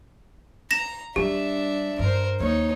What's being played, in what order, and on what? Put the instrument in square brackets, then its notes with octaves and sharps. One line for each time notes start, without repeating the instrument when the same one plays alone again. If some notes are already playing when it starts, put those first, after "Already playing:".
[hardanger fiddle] A#5 [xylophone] A#6 E7
[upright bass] G3 [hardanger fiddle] D4 E5 [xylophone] G4
[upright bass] G2 [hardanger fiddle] A#4 C5
[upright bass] D#2 [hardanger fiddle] D#4 C#5